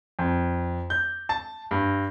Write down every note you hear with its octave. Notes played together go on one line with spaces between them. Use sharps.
F2
G6
A5
G2